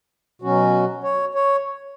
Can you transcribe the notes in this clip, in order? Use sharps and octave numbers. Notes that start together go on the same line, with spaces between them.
B2 F#3 C#4 F#4
C#5
C#5